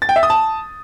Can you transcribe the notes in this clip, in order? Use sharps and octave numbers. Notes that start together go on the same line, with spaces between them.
A6
G5
E5
D#6
A5